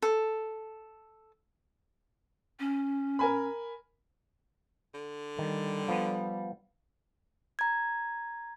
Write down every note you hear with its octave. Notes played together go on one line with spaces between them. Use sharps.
A4
C#4
A#4 G#5 B5
D3
D#3 G3
F3 B3
A#5 G#6